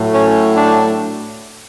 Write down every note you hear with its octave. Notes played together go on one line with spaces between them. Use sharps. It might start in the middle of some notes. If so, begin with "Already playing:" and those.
Already playing: A2 F#3 A3
C#4
D4